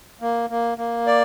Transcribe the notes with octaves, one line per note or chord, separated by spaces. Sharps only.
A#3
A#3
A#3
D5